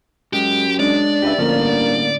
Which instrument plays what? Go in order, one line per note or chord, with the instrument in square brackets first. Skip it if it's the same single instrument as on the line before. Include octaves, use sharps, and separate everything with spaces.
[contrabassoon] F#2 [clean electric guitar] G#3 [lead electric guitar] G4
[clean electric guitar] G#3 C#4 [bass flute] D4 [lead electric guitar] D5
[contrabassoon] C#2 [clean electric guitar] G4 B4 E5
[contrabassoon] F2 [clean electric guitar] A2 D3 C#4 [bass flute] A#3
[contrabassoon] G1